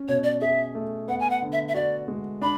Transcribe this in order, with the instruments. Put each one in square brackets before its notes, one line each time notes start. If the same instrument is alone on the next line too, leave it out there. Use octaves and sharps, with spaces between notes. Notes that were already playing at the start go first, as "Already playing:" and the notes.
Already playing: [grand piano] C#4
[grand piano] B2 [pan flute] C#5
[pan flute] D5
[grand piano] G#4 [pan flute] E5
[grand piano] A3
[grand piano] B3 [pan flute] F#5
[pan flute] G#5
F#5
[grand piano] D3
[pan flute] E5
E5
[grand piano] F#4 [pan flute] D5
[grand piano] G#3
[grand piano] D4 [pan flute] B5